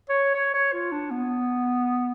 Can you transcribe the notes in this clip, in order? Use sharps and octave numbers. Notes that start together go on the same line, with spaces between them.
C#5
C#5
C#5
F4
D4
B3